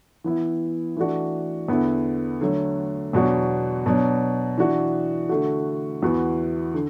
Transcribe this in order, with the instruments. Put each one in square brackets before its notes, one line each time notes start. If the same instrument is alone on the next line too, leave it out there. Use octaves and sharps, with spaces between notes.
[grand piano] E3 B3 E4
E3 A3 D4 F#4
E2 D3 B3 E4
D3 F#3 A3
E2 B2 F#3 D4 F#4
B2 F#3 D4
E3 D4 F#4
D3 A3 F#4
E2 E3 B3 F#4
D3